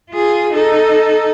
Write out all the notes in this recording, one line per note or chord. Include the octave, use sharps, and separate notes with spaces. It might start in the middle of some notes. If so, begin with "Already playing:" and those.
F4 G#4
D#4 A4